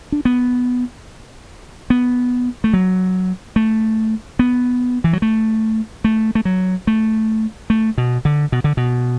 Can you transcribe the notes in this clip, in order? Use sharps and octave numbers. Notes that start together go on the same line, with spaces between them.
D4
B3
B3
A3
F#3
A3
B3
E3
F#3
A3
A3
A3
F#3
A3
A3
B2
D3
B2
D3
B2